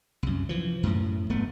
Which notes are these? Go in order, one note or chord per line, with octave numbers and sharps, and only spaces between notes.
C2 F#2
E3 F3
F#2 A2
E1 A3 B3